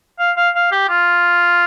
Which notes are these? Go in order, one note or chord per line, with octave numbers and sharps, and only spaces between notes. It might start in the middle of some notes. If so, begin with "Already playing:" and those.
F5
F5
F5
G4
F4